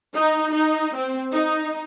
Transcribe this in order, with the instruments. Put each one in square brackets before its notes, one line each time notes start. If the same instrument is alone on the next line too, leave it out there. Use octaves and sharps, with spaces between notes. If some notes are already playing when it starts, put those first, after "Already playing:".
[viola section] D#4
D#4
C4
D#4